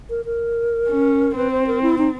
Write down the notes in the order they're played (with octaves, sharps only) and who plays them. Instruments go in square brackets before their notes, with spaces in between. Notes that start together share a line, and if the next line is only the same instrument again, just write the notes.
[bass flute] A#4
A#4
[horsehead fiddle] C#4
[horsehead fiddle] C4 [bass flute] B4
[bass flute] C5
A#4
E4
D#4